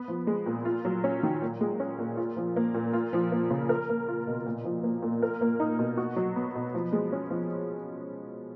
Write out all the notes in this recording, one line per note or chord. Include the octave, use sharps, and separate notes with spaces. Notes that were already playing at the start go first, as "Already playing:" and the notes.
Already playing: B3
F3
G#3
A#2
F4
F#3
C#4
D#3
A#2
G#3
C#4
A#2
F4
F3
A#3
A#2
F4
F3
A#3
C#3
A#4
A#3
F4
B2
A#2
F3
A#3
A#2
A#4
A#3
D#4
B2
F#4
F#3
B3
B2
F3
G#3
C#4
F3